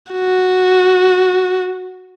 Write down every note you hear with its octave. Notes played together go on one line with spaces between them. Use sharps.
F#4